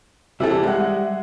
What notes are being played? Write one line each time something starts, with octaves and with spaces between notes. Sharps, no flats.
C3 E3 G3 A4 E5 E6
G#3 F#5